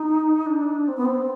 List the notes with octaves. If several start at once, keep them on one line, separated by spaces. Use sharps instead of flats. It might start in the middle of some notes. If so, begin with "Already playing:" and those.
Already playing: D#4
D4
C4
B3
C4